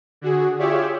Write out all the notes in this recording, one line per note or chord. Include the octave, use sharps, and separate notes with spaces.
D3 F#4 G#4
F4 G4 G#4 C#5 D5 E5